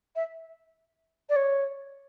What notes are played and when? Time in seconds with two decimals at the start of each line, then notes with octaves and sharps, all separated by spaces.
0.16 E5
1.30 D5
1.36 C#5